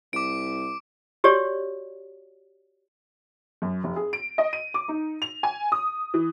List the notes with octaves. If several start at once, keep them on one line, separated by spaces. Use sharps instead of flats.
C2 D6 D7
F#4 G4 C#5 D5
F#2
F1
G#4
D7
D#5
D#7
D6
D#4
F7
G#5
D#6
E3